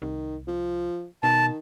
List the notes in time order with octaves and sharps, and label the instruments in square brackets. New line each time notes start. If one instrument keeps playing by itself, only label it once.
[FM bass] C2 [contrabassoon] D#3
[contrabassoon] F3
[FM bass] B2 [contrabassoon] D#3 [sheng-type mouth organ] A5